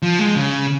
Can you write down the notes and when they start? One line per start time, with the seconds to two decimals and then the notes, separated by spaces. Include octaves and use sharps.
0.02 F3
0.19 G#3
0.36 C#3